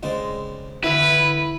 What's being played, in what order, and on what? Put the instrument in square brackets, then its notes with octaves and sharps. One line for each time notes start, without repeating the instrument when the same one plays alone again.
[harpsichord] C#3 D5 [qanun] G#3 C4
[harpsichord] D3 D#6 [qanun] E3 G#5 B5 [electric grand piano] E4 E5 [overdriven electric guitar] B4